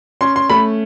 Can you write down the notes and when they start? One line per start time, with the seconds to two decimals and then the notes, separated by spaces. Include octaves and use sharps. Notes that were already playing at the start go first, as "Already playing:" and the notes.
0.21 C#4 C6
0.36 C6
0.50 A3 B5